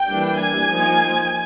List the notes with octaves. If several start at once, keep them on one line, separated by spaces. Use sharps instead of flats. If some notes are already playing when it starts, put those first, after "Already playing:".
Already playing: G5
E3 G3 A#3 D4
G#5
F3 A#3 D#4